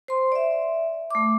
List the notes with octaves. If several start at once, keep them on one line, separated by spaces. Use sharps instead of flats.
C5 C6
D5 E5
A3 D6